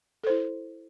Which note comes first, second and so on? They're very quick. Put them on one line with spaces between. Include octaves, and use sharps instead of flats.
A4 C5 E4